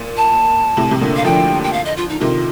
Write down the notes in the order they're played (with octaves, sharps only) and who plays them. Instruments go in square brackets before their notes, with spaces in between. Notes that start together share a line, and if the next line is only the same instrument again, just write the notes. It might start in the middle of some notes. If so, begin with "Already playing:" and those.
Already playing: [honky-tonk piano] A#2
[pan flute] A5
[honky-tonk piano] A2 C3
C3
A#2 D3
[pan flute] F5
[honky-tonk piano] D3 F3 [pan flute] G5
[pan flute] G5
F5
D#5
F4
D#4
[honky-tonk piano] C3 D#3 [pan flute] F4